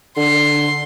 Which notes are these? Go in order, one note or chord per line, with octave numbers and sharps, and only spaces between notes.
D3 C6